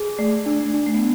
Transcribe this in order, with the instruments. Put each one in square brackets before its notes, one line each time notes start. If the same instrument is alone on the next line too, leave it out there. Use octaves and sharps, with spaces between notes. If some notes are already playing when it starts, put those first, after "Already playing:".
Already playing: [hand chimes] G#4
[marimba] A3 [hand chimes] D5
[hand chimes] D4
[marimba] A3
[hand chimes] D4
[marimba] A3
B3